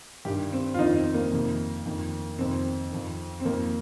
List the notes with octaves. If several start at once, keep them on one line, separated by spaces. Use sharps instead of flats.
G2 D#3 G4
C4
F4
F2 D#3 D#4
C4
A#3
F2 C3 D#3
F2 D#3
F2 C3 D#3 C4
F2 D#3
C4
F2 D#3 A#3